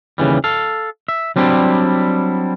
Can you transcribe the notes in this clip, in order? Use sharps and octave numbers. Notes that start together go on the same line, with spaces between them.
D#2 C#3 E3 G3
A4 F5
E5
F#3 G3 C4 D4 E4